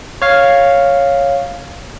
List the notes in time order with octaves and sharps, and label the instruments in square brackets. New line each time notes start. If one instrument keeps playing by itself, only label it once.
[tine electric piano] C#5 F5